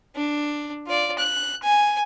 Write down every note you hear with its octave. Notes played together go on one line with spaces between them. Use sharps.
D4
F4 D5
F#6
G#5